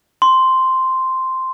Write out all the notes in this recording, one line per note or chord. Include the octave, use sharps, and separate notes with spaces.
C6